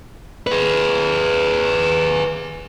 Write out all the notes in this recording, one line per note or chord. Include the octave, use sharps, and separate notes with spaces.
G#4 B4